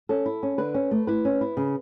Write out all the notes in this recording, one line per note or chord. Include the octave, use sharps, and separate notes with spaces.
C#4 A4
E4
C#4
D3 B4
C#4
A3
E4 B4
C#4
E4
C#3